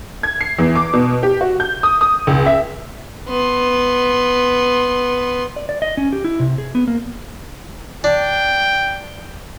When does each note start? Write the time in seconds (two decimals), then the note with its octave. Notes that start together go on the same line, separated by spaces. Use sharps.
0.23 G#6
0.41 C7
0.59 E2
0.75 D6
0.93 B2
1.23 G4
1.41 F#4
1.60 G6
1.83 D#6
2.01 D#6
2.27 C#2
2.46 E5
3.29 B3 C6
5.56 D5
5.69 D5
5.82 D#5
5.97 C#4
6.13 G4
6.24 E4
6.40 C3
6.58 G#4
6.75 B3
6.88 A#3
8.04 D4 G5